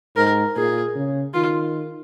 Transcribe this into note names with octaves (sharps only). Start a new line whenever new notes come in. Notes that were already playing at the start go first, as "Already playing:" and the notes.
G#2 A#4
A#2 G#4
C#3
D#3 F4